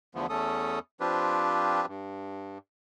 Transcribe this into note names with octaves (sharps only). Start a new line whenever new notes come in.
E2 D3 F3 A3 B3
E2 A3 C#4 A4 D#6
F3 C4 D4 F4 G4 B4
G2